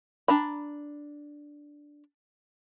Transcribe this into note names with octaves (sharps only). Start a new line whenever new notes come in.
D4 A#5 B5